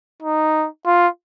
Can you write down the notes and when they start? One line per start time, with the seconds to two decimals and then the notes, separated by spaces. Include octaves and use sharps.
0.23 D#4
0.86 F4